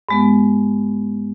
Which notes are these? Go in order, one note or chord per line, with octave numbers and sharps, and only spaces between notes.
G2 G#3 B3